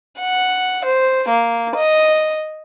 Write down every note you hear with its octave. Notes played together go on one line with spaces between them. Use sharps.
F#5
C5
A#3
D#5